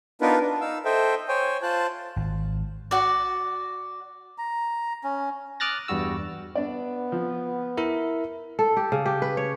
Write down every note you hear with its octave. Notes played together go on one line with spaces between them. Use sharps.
B3 D4 D#4 F4 A#4 B4
D4
D#4 F5 E6
A4 C5 D#5 E5 G5
C5 C#5 G5 G#5
F4 C5 A5 F#6
G#1
F#4 D5
A#5
C#4
D6 D#6 F6 F#6 A6 A#6
E2 G2 G3 F#4 E6
B3 D4 D5
F3
E4 A#4 E5
A4
G4
C#3
G4
B4
C#5